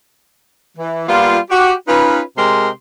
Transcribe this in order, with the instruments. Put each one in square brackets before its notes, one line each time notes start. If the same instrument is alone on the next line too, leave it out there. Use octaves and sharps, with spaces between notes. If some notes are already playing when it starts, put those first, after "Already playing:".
[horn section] E3
G3 A#3 B3 F4
F#4 G4
C#4 D#4 F4 B4
C3 G#3 G4 A#4 C6